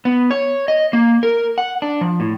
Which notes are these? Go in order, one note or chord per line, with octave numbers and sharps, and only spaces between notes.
B3
C#5
D#5
A#3
A#4
F#5
D4
F3
A2